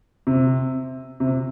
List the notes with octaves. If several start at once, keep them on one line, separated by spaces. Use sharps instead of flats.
C3
C3